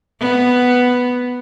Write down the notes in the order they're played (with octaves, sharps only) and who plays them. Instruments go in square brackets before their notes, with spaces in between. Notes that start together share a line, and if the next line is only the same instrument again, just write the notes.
[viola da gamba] B3